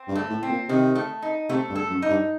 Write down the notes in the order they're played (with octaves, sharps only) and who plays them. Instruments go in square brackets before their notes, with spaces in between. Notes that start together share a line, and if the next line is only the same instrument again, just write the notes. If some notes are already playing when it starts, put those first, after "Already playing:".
Already playing: [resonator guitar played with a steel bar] C4
[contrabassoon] G2
[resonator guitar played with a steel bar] A3
[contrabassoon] A2
[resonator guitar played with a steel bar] C4
[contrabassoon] A#2
[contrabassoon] C3 [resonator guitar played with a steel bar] D#3
[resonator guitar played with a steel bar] A3
D#4
[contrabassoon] C3 [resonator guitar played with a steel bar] A3
[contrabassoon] G2
[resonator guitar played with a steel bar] A4
[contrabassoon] F#2
[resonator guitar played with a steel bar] D#4
[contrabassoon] G2